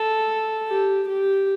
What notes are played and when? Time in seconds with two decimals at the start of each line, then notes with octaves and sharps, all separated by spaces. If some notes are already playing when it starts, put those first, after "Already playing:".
Already playing: A4
0.68 G4
1.09 G4